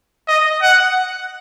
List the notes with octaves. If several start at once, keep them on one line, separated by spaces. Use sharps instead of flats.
D#5
F#5